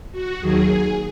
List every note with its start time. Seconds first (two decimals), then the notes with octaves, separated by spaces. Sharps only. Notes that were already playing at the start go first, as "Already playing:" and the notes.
0.12 F#4
0.40 D#2 D#3 F#3 G#4